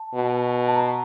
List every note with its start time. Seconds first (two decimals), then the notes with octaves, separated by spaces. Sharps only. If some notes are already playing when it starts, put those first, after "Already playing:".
Already playing: A5
0.14 B2
0.68 A5
0.76 A#5